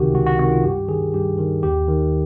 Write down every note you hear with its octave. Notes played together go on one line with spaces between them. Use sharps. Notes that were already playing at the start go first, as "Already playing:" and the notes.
Already playing: C#2 C3 D#3 F#4 G4
C#2 F#4
F#4
C3 D#3 F#4
F4
G2 G4
D#3 G#4
G2 G4
D#3
D#2 G4
D#3